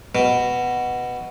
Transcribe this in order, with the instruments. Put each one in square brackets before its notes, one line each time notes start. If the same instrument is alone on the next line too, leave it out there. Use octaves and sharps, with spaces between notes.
[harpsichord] B2